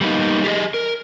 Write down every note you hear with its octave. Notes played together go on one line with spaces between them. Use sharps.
G3 A#3 B3 D#4
G4 G#4 D#5
A#4